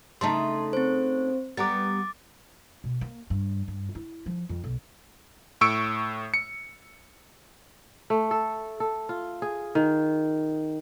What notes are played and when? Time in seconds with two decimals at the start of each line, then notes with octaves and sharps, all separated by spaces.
0.21 C#3 A3 D#4 A5 C6
0.73 C4 C5
1.57 G3 B3 A#4 D6 A6
2.84 B2
3.01 A#3
3.30 G2
3.68 G2
3.95 E4
4.26 F3
4.49 F2
4.64 B1
5.61 A2 C#6 E6 C#7 D7
6.34 C#7
8.10 A3
8.31 A4
8.80 A4
9.09 F4
9.42 G#4
9.75 D#3